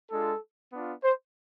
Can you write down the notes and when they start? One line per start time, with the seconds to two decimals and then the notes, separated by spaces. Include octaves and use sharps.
0.11 G#3 D4 F4 A4
0.72 B3 D4 F4
1.03 C5